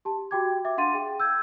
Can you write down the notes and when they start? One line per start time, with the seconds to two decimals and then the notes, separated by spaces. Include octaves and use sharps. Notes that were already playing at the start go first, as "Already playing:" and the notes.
0.05 G4 A5
0.31 F#4 G4 G5 D6 G#6
0.65 E5 D6
0.77 D4 F5 F#5 C6 A6 D#7
0.94 G#4 G5
1.20 E6 G6 G#6